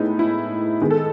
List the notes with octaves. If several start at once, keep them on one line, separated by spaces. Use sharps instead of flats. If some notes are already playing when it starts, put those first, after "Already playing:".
Already playing: A2 G#3 B3 D#4 E4
E4
D#3 G#3 B3
A4